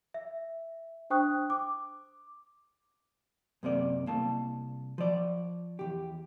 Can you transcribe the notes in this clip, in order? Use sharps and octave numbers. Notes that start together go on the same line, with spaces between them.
E5
D4 C5 G5 C#6 D#6 F#6
D6
F#2 C3 A#3 D5
C2 A#3 A5
F3 D5
E2 A#2 G4